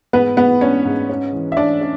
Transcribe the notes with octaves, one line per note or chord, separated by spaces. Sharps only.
G#2 B3 B4
G#2 B3 B4
C#4 D4 C#5
G#2
C#4
E3
E5
C#4 D4 D5
C#4